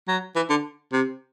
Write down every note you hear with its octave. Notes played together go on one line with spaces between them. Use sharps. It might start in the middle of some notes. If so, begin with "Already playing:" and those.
F#3
E3
D3
C3